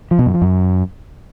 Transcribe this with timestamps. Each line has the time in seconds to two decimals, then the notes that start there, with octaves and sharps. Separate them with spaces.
0.11 F3
0.19 B2
0.26 F#2
0.34 F3
0.42 F#2